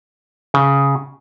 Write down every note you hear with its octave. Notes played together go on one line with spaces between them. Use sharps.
C#3